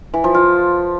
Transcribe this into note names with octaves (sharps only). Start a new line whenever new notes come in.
E3
F3
F4